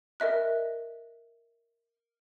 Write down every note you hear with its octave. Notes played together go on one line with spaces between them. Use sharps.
A#4 D#5 E5 F#6